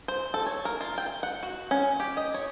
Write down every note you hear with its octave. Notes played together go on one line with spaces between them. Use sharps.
C5
A4
C#5
A#4
F4
G5
F#5
F#4
C#4
G4
D#5
C#5